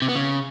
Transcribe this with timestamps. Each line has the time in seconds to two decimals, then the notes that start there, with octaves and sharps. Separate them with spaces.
0.02 C3
0.09 B3
0.15 C#3